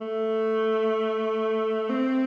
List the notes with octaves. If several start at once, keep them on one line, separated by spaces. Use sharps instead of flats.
A3
C4